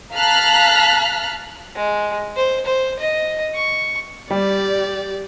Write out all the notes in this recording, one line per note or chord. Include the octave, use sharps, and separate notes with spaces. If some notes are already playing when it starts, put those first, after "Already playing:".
F5 A5 A#5 F6 F#6 B6
G#3
C5
C5
D#5
C#6
G3 G4 D5